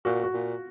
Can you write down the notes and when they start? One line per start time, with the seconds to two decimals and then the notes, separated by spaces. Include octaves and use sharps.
0.05 A#2 F#4
0.24 F#4
0.34 A#2 F4